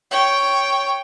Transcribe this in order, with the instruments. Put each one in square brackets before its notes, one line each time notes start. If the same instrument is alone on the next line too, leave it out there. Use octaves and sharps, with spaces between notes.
[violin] C#5 G5